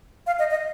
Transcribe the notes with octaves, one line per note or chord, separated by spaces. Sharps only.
F5
D#5
D#5